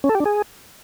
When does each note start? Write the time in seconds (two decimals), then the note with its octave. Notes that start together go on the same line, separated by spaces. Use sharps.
0.04 C#4
0.09 A4
0.15 G4
0.20 D4
0.26 G#4